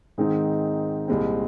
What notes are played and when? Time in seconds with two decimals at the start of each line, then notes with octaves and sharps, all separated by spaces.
0.18 G#2 D#3 G#3 C4 D#4
1.08 C2 A#2 G#3 C4